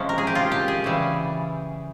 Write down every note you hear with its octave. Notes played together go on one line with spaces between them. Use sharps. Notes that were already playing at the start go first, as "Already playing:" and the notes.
Already playing: C3 F3 G#3 C#4
A#4
G#4
G4
F4
G4
G#4
C#3 E3 G3